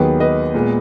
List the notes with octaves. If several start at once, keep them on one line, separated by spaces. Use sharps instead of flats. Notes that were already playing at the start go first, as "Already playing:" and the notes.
Already playing: D#2 D#3 F#3 B3 G#4 B4
B4 D#5
A#2 G#3 B3